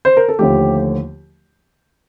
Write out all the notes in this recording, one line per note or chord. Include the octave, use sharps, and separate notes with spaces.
C5
A#4
A4
D#2 D3 F3 A3 G4